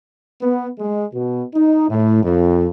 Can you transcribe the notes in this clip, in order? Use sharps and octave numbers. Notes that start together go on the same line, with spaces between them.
B3
G#3
B2
D#4
A2
F2